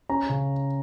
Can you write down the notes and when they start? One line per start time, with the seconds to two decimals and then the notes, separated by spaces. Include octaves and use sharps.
0.09 C#4 A#5
0.29 C#3